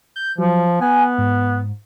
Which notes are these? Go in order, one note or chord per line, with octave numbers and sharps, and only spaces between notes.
G6
F3 F#3
B3 G#5
G#2